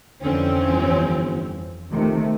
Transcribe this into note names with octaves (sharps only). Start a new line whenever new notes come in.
F2 D3 E3 C4 C#4
G1
F1 C3 D#3 A3